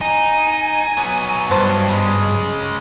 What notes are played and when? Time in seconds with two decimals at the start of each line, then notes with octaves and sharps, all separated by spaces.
0.01 D#4 G#5
0.97 F#3 B3
1.51 G2 B2 C5 A5
1.88 C#3 G#3